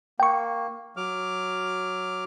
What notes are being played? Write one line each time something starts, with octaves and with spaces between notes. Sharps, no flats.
A#3 G5 C#6
F#3 D6 F6